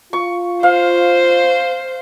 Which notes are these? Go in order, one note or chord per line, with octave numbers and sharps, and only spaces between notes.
F4 C#6
C5 F5